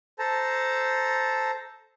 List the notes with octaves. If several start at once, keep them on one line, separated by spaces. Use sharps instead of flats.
A4 C5 A5 A#5